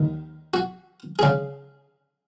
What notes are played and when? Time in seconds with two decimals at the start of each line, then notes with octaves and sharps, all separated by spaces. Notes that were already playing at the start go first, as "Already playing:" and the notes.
Already playing: D#2 D#3
0.54 F#4
1.19 G#4
1.23 C#3